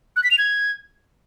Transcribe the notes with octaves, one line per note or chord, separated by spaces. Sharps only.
F#6
B6
F7
G#6